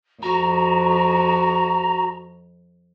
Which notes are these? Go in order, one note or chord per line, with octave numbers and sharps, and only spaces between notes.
F2 F#4 A#5